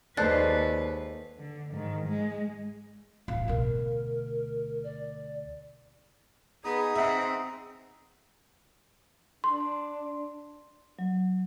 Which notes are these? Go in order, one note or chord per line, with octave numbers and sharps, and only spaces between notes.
D#2 G#3 A4 B4 C5 D5 F#6 A6
D3
G#2 D#3
G#3
D1 A1 F5
D2 B2 A#4
D5
B3 D#4 G#4 A#5 D#6
C4 E5 F#5
D4 C6
F#3